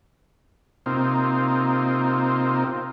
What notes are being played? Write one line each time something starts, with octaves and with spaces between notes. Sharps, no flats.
C3 A#3 C4 D#4 F4